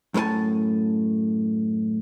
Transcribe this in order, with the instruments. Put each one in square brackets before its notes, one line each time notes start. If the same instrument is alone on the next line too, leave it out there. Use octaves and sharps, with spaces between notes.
[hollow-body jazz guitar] F#2 A2 A#4 G#5 A5